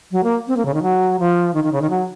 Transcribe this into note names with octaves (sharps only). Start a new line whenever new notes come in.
F#3
A#3
C4
A#3
C#3
D#3
F#3
F3
D#3
D#3
C#3
D#3
F#3